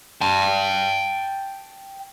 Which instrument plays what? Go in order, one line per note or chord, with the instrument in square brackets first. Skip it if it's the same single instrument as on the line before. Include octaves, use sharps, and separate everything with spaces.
[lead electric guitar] G5 A5